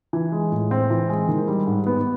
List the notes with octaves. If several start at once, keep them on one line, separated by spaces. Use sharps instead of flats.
E3
G#3
A2
C4
E3
G#3
D#3
G3
G#2
B3